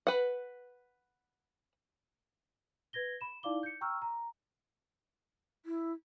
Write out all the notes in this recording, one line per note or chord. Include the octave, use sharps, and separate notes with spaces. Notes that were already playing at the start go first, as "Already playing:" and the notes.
B4 F#5
B4 G#6 A#6 G7
B5 E7
D#4 E4 D5 F5 D6 G7
G6 C#7
G5 A#5 C#6 E6 F6
A#5
E4